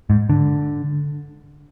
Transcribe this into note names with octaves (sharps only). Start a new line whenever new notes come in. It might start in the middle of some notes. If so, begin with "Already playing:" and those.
G#2
D3